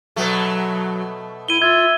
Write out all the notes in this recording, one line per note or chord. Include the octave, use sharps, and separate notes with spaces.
B2 F#3 A3
E4 D#7 G7
F4 E5 G#6